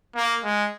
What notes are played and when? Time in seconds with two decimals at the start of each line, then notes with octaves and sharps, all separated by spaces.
0.15 A#3
0.44 G#3